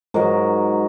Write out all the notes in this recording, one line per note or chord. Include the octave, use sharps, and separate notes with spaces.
G#2 F#3 A#4